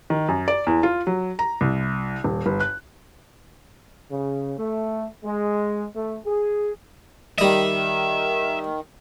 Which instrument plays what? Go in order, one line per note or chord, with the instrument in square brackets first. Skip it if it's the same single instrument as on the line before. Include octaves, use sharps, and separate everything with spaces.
[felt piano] D#3
F#2
D5
E2
F4
F#3
A#5
C2
D#1
G1
F#6
[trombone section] C#3
A3
G#3
A3
G#4
[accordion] D#3 [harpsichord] G3 D#5 [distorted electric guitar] E5